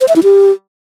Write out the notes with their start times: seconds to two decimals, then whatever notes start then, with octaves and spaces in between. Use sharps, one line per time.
0.01 C5
0.08 E5
0.16 E4
0.23 G4